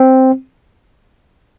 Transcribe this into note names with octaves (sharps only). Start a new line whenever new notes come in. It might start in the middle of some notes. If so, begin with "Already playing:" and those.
Already playing: C4